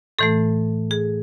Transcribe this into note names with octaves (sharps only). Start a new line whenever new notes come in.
A2 E3 A3 A4
G#4